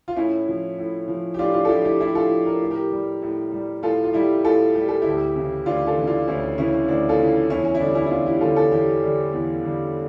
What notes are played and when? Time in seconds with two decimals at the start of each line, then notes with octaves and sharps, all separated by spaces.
0.08 F4
0.16 A2 C#4 E4
0.48 F3
0.78 A2
1.08 F3
1.34 G4
1.39 A2 D4 F4
1.54 D4 F4
1.65 A4
1.69 F3 E4 G4
1.85 E4 G4
2.00 A2 E4 G4
2.15 F4 A4
2.30 F3
2.46 A#4
2.61 A2
2.71 G4 A#4
2.92 G3
3.22 A2
3.52 G3
3.83 A2 F4 A4
4.04 F4
4.13 G3 E4 G4
4.45 A2 F4 A4
4.75 G3 G4
4.89 A4
5.02 D2 E4 G4
5.36 C#3 E3
5.66 D2 D4 F4
5.87 F4 A4
5.97 C#3 E3
6.07 D4 F4
6.28 D2 C#4 E4
6.58 C#3 E3 C#4 E4
6.73 C#4
6.88 D2 D4
7.09 F4 A4
7.19 C#3 E3
7.50 E2 C#4 E4
7.65 C#4
7.75 E4
7.80 D3 G3 D4
7.95 C#4 E4
8.06 E4
8.11 E2 D4 F4
8.26 E4 G4
8.41 D3 G3 F4 A4
8.56 F4 A4
8.72 E2 E4 G4
9.03 D3 G3
9.33 E2
9.63 D3 G3